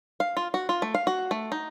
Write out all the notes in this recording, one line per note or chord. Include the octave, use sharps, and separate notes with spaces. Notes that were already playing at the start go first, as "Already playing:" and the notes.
F5
F4
F#4
F4
A3
F5
F#4
A3
D#4